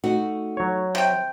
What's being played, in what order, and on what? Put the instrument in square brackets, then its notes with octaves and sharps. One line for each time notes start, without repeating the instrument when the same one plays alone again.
[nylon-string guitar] A3 D#4 F#4
[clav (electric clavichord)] F#3 C#5
[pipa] C3 G5